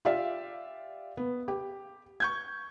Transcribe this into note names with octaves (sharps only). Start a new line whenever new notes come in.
F4 G4 D5 E5 F5
B3
G4
C#6 G6 G#6